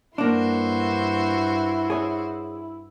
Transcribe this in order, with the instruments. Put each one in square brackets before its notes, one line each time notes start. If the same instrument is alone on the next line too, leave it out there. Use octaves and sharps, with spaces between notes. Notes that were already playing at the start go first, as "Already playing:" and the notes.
[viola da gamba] G2 F#4 C5 [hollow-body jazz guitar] A#3 D4 [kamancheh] E4
[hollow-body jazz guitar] G#4 C#5